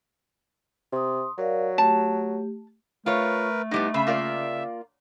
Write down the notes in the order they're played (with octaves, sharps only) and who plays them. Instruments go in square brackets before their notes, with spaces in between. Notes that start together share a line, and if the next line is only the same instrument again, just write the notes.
[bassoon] C3 [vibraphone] C6 D#6
[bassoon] F#3 [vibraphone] A#4 D5 F5
[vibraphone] A3 G4 [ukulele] A5
[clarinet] A3 [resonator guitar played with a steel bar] F4 C#5 [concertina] A#4 B4
[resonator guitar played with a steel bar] A2 G3 B3 [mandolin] D#4
[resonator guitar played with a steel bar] C#3 [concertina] E5 [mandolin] B5
[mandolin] A#3 F4 D5